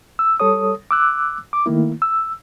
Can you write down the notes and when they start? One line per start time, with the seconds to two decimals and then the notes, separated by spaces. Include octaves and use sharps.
0.19 E6
0.40 G3 A4 C#5 D#6
0.91 D6 E6 F#6
1.53 D6
1.66 D#3 A3 A#3 E4
2.02 E6